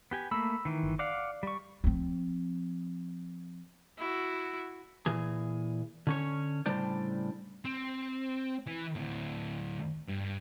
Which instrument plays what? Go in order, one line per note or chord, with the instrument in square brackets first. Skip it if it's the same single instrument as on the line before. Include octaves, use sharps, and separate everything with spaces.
[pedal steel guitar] B3 G4 G#5
[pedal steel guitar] A3 A#3 [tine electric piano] B5 E6
[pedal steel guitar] D#3 E3
[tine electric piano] G1
[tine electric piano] D5 [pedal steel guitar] F5 F#5 D6
[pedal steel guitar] G3 C#6
[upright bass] F3 C4
[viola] E4 F#4
[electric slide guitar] A#2 E3 G#4
D3 C#4 C#5
A2 C#3 G3 D4 C5 D5
[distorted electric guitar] C4
E3
D2 A2
G2